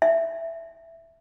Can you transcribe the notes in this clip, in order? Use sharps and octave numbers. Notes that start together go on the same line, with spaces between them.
E5